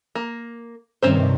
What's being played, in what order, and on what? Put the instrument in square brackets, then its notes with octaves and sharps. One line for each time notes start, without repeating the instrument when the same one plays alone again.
[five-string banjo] A#3
[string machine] G2 C3 D#3 [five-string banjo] C4 C#4 C5